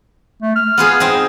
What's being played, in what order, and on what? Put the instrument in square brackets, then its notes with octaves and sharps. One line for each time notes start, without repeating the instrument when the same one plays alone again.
[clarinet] A3
F6
[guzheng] B3 F4 G#4
C4 D#4